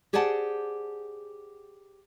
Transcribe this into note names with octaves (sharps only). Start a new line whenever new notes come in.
G4 G#4 C5 D5 F#5 A5